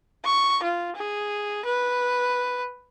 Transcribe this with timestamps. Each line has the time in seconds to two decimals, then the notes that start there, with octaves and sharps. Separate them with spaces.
0.25 C#6
0.63 F4
0.96 G#4
1.65 B4